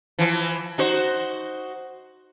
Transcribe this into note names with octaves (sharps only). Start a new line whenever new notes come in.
E3 F3
D#4 F#4 C5